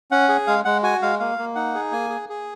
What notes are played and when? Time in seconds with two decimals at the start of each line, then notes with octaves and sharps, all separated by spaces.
0.11 C#4 F#5
0.29 G#4
0.47 G#3 F5
0.65 G#3 F#5
0.83 F#4 G#5
1.02 G#3 F5
1.20 A#3 F5
1.38 A#3
1.55 D#4 F#5
1.75 G#4
1.92 A#3 G#5
2.10 G#4
2.29 G#4